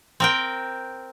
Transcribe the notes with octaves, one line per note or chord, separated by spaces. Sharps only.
C4 A#4 G5